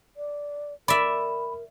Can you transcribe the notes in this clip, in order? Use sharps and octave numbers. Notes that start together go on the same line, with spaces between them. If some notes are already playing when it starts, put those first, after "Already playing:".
D5
A#4 D5 E5 B5